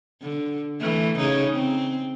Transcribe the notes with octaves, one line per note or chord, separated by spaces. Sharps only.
D3
E3 A3
C#3 D#4 G#4
C4